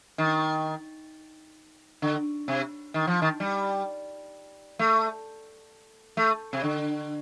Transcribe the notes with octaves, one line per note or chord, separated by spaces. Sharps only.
D#3
D3
C3
D#3
F3
D#3
G3
A3
A3
C3
D3